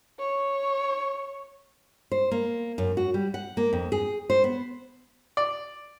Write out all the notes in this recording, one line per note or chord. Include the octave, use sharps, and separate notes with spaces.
C#5
C5
A#3
F#2
F#4
G3
F#5
A#3
F2
G#4
C5
B3
D5